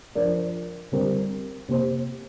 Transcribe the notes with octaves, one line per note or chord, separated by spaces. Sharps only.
F3 D4 A#4 D5
D3 G3 C4 A#4
C3 A#3 G4 C5